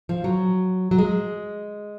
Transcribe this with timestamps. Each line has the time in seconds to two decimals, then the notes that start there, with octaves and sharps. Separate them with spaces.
0.09 F3
0.24 F#3
0.91 F#3
0.98 G#3